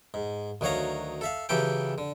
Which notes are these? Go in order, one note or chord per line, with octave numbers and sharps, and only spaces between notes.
G#2
D2 D#3 F#3 C#5 F5 A#5
A4 E5 F5
C#3 E3 F#3 G4 A4 G5
D3